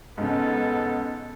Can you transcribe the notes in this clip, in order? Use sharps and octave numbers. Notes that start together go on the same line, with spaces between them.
G#2 C#3 B3 A4